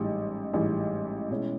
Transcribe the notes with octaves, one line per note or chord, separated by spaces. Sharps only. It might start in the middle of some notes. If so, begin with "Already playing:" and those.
Already playing: A1 G#2 E3 G3
A1 G#2 E3 G3
B2 G#3 C#4 E4